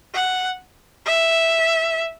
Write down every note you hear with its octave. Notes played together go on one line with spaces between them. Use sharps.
F#5
E5